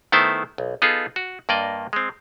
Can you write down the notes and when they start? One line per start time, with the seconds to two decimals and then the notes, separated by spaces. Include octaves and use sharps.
0.12 D#3 A3 B3 E4 C5 A5
0.58 B1
0.82 B3 D#4 F4 G#4 A4
1.16 F#4
1.49 G2 A#3 D5 D#5
1.93 G#3 C4